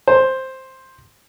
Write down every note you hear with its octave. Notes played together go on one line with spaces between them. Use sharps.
C5